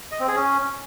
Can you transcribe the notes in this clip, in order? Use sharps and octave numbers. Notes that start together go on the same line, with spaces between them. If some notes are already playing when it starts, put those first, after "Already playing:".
D#5
C4
G#4
C#4